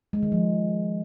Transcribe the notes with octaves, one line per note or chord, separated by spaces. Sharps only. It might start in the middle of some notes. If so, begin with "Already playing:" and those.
G#3
D#3
F3